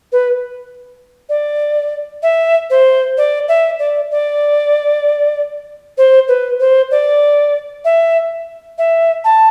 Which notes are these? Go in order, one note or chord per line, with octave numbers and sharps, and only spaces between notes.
B4
D5
E5
C5
D5
E5
D5
D5
C5
B4
C5
D5
E5
E5
A5